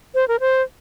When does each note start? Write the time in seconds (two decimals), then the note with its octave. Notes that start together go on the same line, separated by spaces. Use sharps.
0.15 C5
0.28 A#4
0.40 C5